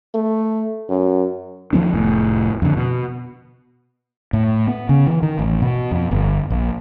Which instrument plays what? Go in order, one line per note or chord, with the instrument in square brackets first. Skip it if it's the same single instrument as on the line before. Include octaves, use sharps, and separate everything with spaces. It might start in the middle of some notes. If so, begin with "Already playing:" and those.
[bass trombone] A3
F#2
[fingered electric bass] D#3 F3 B3 D4
F1 A2
F2 D3
B2
A2
B3
C#3
E3
D#3
A1
B2
F2
G1
A#1